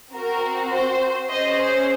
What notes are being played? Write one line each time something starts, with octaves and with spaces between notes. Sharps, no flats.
C4 F#4 A#4
C5
C#4 G#4 C5 D#5
C5